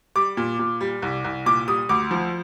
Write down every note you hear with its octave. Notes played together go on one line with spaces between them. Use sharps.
G3 D6
A#2
A#2
G3
C2
C2
A#2 D6
G3 D#6
D2 D6
F3